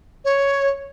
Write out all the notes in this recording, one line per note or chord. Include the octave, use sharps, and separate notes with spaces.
C#5